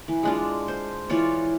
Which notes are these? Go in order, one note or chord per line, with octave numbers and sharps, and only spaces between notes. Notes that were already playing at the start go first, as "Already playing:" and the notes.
E3
G#3 D4 F4
C5
E3 F4 C#5 D5